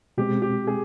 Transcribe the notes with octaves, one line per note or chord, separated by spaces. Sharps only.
B2 G#3 C4 G4
G4
G#4